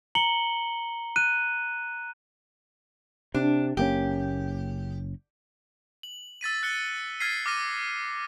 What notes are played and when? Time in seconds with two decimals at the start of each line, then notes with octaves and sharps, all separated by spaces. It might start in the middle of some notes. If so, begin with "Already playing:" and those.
0.15 A#5 C#7 F#7 G7
1.16 F#6 D#7
3.34 C3 D4
3.77 F#1 A#3 C#4 G4
6.03 F#7
6.41 E6 A6 B6 D#7
6.63 F#6 C#7 G7
7.20 F6 G#6 A6 B6 C7 D#7
7.46 D6 F6 A#6 D#7